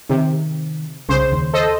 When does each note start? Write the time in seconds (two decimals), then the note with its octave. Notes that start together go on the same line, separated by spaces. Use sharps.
0.10 C3 D#3
1.09 C2 C#3 C5
1.32 D#2
1.53 A4 C5 D#5